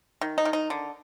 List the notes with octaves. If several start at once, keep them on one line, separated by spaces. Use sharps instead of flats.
D#3
D#4
D#3
D#4
D3